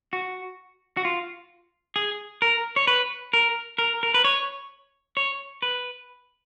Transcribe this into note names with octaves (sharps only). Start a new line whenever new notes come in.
F#4
F#4
F4
G#4
A#4
C#5
B4
A#4
A#4
A#4
B4
C#5
C#5
B4